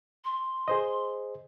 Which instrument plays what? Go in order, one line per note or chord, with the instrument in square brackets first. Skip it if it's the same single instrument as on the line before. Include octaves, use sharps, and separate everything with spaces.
[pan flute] C6
[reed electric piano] G#4 C5 D#5